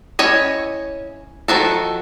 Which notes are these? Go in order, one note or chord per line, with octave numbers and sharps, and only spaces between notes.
C#4 E4 C#5 D#5
D#3 F3 F#4 A4